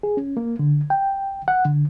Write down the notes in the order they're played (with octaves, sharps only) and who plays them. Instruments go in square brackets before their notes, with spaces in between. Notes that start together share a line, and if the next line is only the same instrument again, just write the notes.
[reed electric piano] G#4
C#4
A#3
D3
G5
F#5
D3